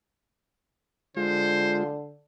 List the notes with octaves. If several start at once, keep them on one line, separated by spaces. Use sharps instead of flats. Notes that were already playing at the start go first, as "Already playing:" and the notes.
D3 G#3 F4 C5